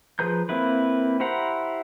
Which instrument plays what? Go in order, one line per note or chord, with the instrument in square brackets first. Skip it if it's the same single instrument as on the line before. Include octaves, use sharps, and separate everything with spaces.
[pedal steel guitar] F3 G#4 B4 A#5 G6
A#3 C4 E4 B4
E4 G4 C5 F#5 A#5